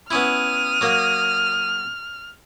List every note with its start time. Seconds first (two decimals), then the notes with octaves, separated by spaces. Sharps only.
0.11 B3 C#4 E4 D#6 F6
0.81 F#3 A#3